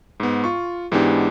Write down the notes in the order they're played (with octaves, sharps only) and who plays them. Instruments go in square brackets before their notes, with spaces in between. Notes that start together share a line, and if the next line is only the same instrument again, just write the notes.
[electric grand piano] G#2 B3
F4 C#6
G#2 E3 G#3 B3 D4 G4